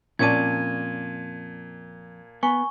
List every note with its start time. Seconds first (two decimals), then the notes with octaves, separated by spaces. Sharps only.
0.19 F2 A#2 C#4 D5 A5 G#6 D#7
2.43 B3 G#5 C#6